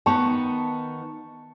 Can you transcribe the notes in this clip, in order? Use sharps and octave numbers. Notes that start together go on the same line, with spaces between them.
D#3 B3 D#4 A5 C#6